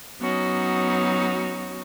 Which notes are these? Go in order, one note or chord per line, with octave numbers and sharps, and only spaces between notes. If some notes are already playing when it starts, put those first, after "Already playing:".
F#3 B3 C#4 D#4 F#4